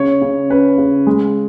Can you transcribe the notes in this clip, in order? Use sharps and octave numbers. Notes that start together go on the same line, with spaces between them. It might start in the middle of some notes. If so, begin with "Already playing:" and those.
Already playing: C#3 C#5
C#3
C#4 B4
C#3
G#3